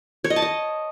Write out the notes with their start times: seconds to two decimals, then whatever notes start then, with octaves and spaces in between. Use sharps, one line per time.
0.24 C#5
0.30 D#5
0.36 A5
0.42 D#5